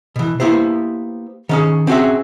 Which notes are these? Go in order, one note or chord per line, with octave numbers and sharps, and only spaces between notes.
B2 E3
A#3 B3 E4 G4 C5
D#3 C#4 G#4
C4 C#4 F#4 G#4 E5